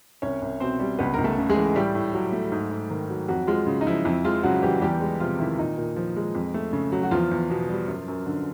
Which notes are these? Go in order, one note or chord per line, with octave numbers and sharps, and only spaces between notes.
C2 C#4 C#5
C2
B2 C4 C5
G3
C#2 B3 B4
C#2 A#4
A3 A4
C#3
G#3 G#4
E3
A2 G3 G4
A2
F#3
A3
G#2
G#2
D#3
F#3
F2 F#3 F#4
F3 G#3 F4
C#3
D#4
F3 E4
F2 E4
F3 G#3 F4
C#3 F#3 F#4
E3 G3 G4
E2 G3 G4
G#3
C3 F3 F4
D#3 E4
A#2 D#4
A#2
F3
G#3
F2
A3
C#3
F#3
F#4
E2 F3 F4
E2
B2
G3
F#2
F#2
D3